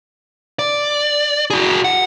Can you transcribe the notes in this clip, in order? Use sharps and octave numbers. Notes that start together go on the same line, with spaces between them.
D5
F#4 G#4
F#5